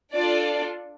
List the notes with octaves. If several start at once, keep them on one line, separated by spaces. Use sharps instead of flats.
D4 F4 A4 D5